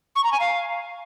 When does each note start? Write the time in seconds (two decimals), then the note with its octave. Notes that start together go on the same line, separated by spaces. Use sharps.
0.16 C#6
0.24 A#5
0.32 G#5
0.40 F5